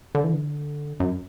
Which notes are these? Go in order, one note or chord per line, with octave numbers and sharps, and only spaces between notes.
D3
E3
D3
F#2